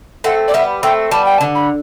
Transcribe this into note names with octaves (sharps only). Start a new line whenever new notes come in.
A3 C4 F#5
D5
G3 B3 E5
A3 C4 G5
G3 B3 A5
G5
A5
D3
B5